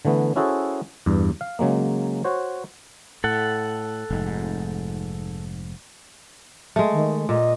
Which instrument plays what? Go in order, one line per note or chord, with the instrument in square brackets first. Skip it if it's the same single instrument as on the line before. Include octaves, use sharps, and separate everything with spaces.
[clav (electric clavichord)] D3 E3 A3 B3
C#4 E4 F#4 G#4 A4 C5
E2 G2
F5
C#3 F#3 G#3 A#3
F#4 C5 C#5
[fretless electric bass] A2 [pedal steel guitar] A4 F#5
[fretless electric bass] F1 G#2
[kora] G#3 A3
[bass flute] D#3
[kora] A#2 [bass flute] D#5